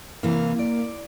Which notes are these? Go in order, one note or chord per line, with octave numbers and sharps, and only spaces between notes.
C3 E3 A#3 F5
D5